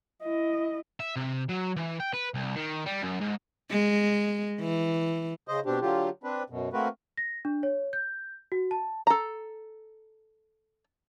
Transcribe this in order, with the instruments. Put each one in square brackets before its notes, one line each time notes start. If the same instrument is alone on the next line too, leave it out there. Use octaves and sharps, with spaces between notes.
[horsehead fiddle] E4 D#5
[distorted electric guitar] E5
C3
F#3
E3
G5
B4
C2
D#3
G3
F#2
G#2
[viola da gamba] G#3
E3
[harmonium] C#3 C5 D#5
B2 C4 D4 G4
D3 F#3 F4 G4
C4 D4 B4
F#2 B2
A3 A#3 C4 F#4 A#4 B4
[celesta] A#6
D4
C#5
G6
F#4
A5
[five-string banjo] A4 A#5